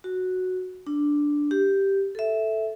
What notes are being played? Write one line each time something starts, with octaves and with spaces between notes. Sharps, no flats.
F#4
D4
G4
A4 E5